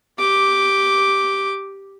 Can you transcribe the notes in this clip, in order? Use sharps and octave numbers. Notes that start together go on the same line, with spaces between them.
G4 D6